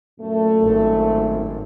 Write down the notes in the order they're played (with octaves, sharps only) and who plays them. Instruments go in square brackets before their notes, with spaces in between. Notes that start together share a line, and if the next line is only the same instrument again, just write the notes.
[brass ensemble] F#2 A#2 A3
[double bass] G#1